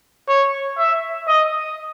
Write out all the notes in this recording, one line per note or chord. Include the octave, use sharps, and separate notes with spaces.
C#5
E5
D#5